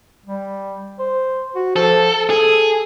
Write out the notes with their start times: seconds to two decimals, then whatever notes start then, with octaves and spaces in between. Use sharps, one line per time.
0.26 G3
0.99 C5
1.55 F#4
1.76 F3 A4
2.30 G#4 A4